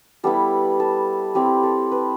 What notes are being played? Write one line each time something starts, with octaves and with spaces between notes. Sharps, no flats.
G3 B3 E4 A4
A4
G3 C4 E4 G4
A4
B4